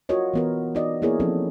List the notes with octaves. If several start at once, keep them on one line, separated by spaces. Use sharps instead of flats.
F4 F#4 A#4 C#5 D#5
E3 B3 A#4
D4 D#4 F#4 D5 D#5
A#3 B3 E4 G#4 A#4 C#5
F3 C4 C#4 A4